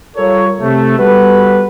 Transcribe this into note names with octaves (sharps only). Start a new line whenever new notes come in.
G3 F4 A4 A#4 C#5
C3 A3
G3 B3 F#4 A4 B4